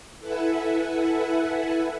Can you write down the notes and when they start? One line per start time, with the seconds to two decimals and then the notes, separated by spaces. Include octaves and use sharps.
0.20 E4 A4 B4 E5 F#5 G#5